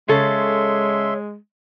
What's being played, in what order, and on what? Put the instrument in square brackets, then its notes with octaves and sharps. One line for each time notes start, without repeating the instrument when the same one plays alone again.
[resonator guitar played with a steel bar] C#3 A4 [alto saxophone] G#3 [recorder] C#5 [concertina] E5 C6